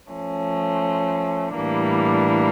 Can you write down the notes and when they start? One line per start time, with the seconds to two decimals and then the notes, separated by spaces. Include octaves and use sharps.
0.12 F3 A3 C#4
1.56 A2 E3 G3 A#3 D4